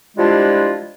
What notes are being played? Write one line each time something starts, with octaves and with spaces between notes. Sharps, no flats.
F3 G3 G#3 D4 E4 F4